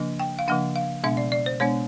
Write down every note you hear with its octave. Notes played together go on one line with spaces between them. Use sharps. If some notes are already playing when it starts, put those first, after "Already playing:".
Already playing: C#3 F3 A#3 D4
G5
F5
C#3 F3 A#3 D4 F#5
F5
B2 G#3 B3 D4 E5
D5
D5
C5
B2 G#3 B3 D4 C#5